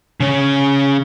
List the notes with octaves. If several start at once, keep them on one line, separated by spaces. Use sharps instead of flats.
C#3 C#4